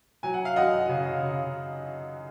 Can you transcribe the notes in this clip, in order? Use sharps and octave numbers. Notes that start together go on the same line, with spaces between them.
F#3 G#5
F#5
F5
F#2 D#5 F#5
C#3
C#3